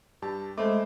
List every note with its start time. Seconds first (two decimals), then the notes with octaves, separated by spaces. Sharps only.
0.22 G2 G4 A5
0.58 G#3 A3 C5 B5 D6